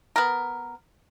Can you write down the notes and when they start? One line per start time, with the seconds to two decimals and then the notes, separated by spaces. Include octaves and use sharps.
0.16 B3 A#4